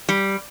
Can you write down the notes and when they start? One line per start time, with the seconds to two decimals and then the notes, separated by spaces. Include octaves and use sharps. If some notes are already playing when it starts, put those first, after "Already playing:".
0.09 G3